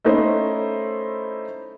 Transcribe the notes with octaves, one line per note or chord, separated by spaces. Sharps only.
A3 C#4 D#4 E4 C5 D#5